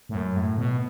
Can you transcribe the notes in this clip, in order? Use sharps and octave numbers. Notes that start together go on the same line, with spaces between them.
A2
F#2
A2
B2